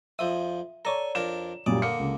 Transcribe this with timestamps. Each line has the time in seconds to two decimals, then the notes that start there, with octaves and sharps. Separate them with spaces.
0.19 F2 F3 E5 D#6
0.85 A4 C#5 D5 G#5 A#5
1.15 F2 D4 A#4 E7
1.66 F#2 A#2 G3 D5 D#6
1.82 D3 A#3 F5 C#7
1.99 C#2